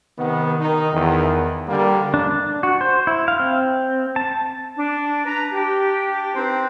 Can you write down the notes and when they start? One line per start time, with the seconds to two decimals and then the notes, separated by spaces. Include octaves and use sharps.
0.18 C3 D#3 B3
0.60 D#3 D#4
0.93 E2 D#3
1.69 D3 G3 A#3
2.14 D4
2.63 F#4
2.81 C5
3.07 E4
3.28 F5
3.40 C4
4.16 A5
4.77 D4
5.25 B4 A#5
5.52 D4 G4
6.35 C4 D#4 B4 C5